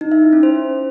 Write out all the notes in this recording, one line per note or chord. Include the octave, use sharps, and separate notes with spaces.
D#4
E5
E4
C#4
C5